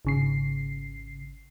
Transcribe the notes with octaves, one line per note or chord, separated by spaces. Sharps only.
G#1 C#3 C7